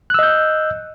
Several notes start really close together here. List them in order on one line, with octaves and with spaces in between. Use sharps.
F#6 E6 D#5 G6